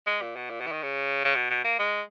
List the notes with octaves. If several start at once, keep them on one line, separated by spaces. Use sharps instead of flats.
G#3
A#2
B2
A#2
B2
E3
D#3
C#3
C#3
B2
B2
A#3
G#3